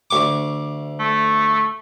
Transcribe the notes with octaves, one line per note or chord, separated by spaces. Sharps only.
D2 C#6 D6
A3